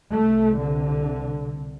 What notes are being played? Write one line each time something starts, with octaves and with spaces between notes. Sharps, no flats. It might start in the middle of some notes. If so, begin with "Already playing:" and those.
C2 C3 A3
D3